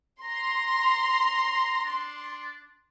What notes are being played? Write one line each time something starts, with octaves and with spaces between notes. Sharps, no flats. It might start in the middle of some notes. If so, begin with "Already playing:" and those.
A#5 C6
D4